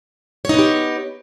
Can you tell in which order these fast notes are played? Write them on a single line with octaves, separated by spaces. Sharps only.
C#5 D#4 B3 G4